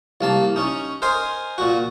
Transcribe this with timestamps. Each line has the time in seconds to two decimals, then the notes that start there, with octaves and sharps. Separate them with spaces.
0.21 C2 A#3 A5
0.56 C#4 D#4
1.02 A#4 C5 D#5 G#5 C6
1.58 A#2 F#4